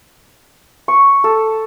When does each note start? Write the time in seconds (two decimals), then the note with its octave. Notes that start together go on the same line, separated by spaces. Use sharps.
0.88 C#6
1.24 A4